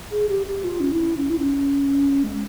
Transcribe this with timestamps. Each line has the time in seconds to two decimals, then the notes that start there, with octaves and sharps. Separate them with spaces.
0.12 G#4
0.29 G4
0.47 G4
0.64 F4
0.80 C#4
0.92 E4
1.17 C#4
1.30 E4
1.40 C#4
2.24 G#3